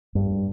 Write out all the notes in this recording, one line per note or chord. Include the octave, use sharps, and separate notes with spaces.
G2